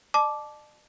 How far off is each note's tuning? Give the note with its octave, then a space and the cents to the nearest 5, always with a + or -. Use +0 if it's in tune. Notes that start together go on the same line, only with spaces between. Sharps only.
D5 +45 A5 -20 D6 +0